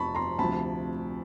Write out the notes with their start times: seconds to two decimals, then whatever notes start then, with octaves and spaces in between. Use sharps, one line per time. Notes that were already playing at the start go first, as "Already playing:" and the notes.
Already playing: F1 F3 A5 B5 C#6
0.15 A#5 C6
0.39 D2 C3 F3 A5 B5